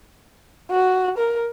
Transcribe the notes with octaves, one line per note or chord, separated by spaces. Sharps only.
F#4
A#4